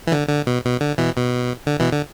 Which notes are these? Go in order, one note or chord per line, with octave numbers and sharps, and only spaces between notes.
E3
D3
D3
B2
B2
D3
B2 E3
B2
D3
B2 E3
D3